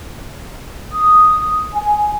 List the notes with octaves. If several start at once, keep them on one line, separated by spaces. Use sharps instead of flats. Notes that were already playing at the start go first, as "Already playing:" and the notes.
D#6
G#5